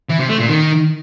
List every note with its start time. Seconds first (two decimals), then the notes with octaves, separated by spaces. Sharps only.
0.09 E3
0.19 C3
0.29 A3
0.39 A#2
0.49 D#3